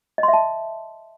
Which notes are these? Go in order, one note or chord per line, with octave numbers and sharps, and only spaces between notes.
D#5
C6
E5
A5